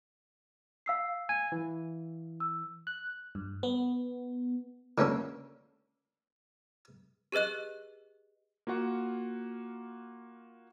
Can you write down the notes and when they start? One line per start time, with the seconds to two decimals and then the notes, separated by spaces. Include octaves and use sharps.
0.86 F5 E6 C7
1.29 G#5
1.52 E3
2.40 E6
2.87 F#6
3.35 G2
3.63 B3
4.98 D3 A#3 C#4 A4
7.32 G4 G#4 B4 D#5 F#6
8.67 A#3 F4 F#4 F#5